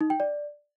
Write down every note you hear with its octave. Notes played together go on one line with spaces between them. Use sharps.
D#4
G5
D5